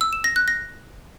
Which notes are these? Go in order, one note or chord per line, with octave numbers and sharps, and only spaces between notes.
E6
E7
A#6
F#6
A#6